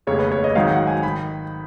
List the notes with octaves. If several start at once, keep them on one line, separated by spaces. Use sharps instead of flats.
F1 D#2 C#3 G#3 C#5
B4
C#5
D#5
G#1 G#2 D#3 F#3 F5
F#5
G#5
D#3 B5